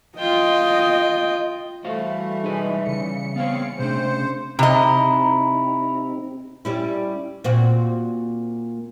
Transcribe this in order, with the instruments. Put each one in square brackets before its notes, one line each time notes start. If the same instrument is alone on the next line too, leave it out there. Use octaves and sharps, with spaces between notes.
[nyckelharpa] F4 G5 [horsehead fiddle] D#5
[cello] E3 G3 [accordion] A3 [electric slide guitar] F#4 C5 F5
[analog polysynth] G#3 [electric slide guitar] D#4 B4
[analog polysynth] C#3 C#7
[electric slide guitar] B3 C4 C#5 [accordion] F5
[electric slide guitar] C3 A3 D4 [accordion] C5
[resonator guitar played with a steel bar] C3 D#5 [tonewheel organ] C4 D#4 G4 [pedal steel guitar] E4 A#5
[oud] G3 C#4 E4
A#2 C4 F#4